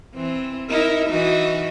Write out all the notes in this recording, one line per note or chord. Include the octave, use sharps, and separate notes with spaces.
E3 C4
D#4 E4 A#4
E3 D#4 F#4